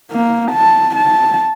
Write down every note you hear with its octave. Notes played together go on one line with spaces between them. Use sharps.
A#3
A5
A5